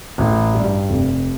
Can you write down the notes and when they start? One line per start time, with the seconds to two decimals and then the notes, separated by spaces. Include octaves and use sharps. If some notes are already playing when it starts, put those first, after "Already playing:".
0.18 A1
0.54 G2 G3
0.89 F1